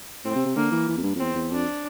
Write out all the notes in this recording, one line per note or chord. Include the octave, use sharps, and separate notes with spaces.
A2 C4
C3
C3
D3 A#3
E3
E3
F2
G2
F2
E2 C4
E2
F2 D4